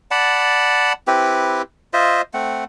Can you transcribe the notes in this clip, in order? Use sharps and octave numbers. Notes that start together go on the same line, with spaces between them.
D5 F#5 A5 B5
C4 E4 G4 B4
F4 C5 D#5 E5
A3 C4 F#5